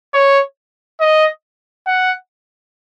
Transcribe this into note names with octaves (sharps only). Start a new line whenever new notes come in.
C#5
D#5
F#5